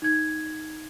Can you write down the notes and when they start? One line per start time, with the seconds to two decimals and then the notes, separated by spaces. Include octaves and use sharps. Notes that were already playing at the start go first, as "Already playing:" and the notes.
0.02 D#4 G#6